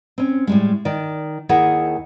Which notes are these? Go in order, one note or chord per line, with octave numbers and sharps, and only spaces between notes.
C4 C#4
A2 G3 G#3
D#3 D5
D#2 D#3 E4 G#4 A#4 F#5